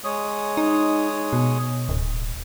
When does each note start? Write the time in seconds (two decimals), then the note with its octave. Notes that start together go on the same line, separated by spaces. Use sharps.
0.04 G#3 C#5 D#6
0.57 D#4
1.33 B2
1.89 D1